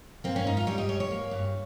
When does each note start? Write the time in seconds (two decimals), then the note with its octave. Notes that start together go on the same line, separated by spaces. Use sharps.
0.24 A#3 C4
0.36 C#4
0.46 G#2 D#4
0.57 F4
0.67 G3 C#5
0.78 D#5
0.89 G#2 C#5
1.00 C#5
1.11 A#3
1.31 G2